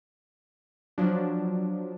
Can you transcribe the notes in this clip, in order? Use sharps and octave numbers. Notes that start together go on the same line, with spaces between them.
F3 F#3 D4